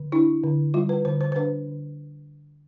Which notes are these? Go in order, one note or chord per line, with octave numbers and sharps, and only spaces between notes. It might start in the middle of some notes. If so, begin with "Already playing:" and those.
Already playing: D3
D4 E4
D3
G3 F4
B4
D3 C5
C5
C5
D4 B4
D3